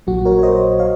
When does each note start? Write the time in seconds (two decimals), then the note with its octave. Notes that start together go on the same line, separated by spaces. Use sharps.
0.07 A#1 A#2 F#3 F#4
0.25 A#4 C#5
0.39 C#5
0.43 C5 D#5
0.79 C#5 F5